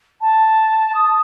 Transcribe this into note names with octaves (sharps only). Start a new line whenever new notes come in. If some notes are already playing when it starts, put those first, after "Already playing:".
A5
D#6